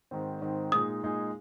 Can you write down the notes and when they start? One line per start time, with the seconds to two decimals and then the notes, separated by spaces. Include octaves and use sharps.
0.11 G#2 D#3 C4
0.42 G#2 D#3 C4
0.72 A#2 G#3 D#4 G#4 D#6
1.03 A#2 G#3 D#4 G#4